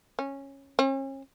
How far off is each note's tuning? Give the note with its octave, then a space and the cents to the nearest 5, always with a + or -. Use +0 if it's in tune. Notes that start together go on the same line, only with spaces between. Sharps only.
C#4 -10
C#4 -40